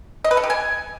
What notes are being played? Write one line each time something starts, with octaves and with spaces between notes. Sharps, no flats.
D#5
B4
A4
G4
G#5